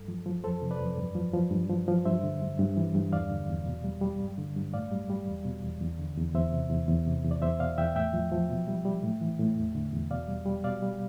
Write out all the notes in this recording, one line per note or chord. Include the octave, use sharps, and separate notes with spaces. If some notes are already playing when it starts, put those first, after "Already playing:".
Already playing: G2 A4
F3
F3
F2 A4 C5
C3
B4 D5
F2
G2
F3
F3
G2
F3
F3
G2 C5 E5
D3
G2
G2
E3
G2
E2 D5 F5
D3
E2
B2
G3
G3
G2
D3
G2
A2 D5 F5
G3
G3
E2
B2
E2
E2
D3
E2
E2 C5 E5
C3
E2
E2
C3
E2
D5
E2 C5 E5
B2 D5 F5
E2 E5 G5
A2 E5 G5
F3
F3
B2
G3
G3
A2
E3
A2
E2
D3
E2
B2 D5 F5
G3
G3
B2 D5 F5
G3